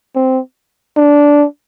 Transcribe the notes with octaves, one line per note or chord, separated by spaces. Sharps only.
C4
D4